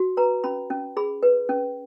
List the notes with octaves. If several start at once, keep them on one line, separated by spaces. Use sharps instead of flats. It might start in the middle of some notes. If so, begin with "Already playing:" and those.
Already playing: F#4
B4 A#5
C#4 B5
C#4
G#4 B5
B4
C#4